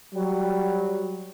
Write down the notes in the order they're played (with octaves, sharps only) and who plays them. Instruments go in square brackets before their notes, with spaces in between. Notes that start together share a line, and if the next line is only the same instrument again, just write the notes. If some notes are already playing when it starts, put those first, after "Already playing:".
[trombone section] F#3 G3